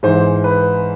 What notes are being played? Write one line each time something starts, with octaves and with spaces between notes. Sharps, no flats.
G#2 E3 C5
B4